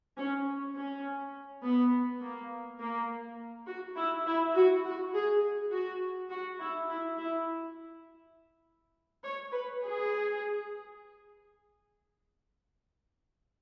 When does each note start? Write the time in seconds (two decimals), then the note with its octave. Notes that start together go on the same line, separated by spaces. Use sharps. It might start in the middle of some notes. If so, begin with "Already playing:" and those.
0.17 C#4
0.74 C#4
1.63 B3
2.21 A#3
2.80 A#3
3.67 F#4
3.96 E4
4.26 E4
4.55 F#4
4.84 F#4
5.13 G#4
5.72 F#4
6.30 F#4
6.59 E4
6.89 E4
7.18 E4
9.23 C#5
9.52 B4
9.82 G#4